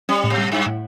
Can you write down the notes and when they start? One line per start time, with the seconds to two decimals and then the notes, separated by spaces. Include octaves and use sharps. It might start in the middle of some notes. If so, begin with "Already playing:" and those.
0.09 G3 C#4
0.24 A2
0.30 B2
0.38 G3
0.52 G2 E4
0.66 A2